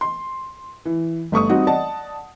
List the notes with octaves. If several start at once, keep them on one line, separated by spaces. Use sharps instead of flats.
C6
E3
G1 A3 C#6 D#6
G3 C4 D#4 F#4
D5 D#5 F#5 A5